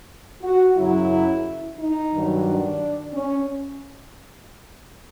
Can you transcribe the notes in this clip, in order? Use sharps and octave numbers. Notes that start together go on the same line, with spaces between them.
F#4
F#2 C#3 F#3 E4
D#4
G2 D#3 F#3
D4
C#4